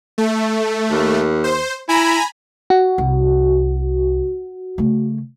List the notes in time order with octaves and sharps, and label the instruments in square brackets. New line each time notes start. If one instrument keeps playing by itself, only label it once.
[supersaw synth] A3
[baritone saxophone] D#2
[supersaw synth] C5
[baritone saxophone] E4 [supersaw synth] G#5 A#5 B5
[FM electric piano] F#4
[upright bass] C2
C#3 A3